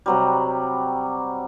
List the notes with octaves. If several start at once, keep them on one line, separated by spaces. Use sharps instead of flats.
C3 F#3 G3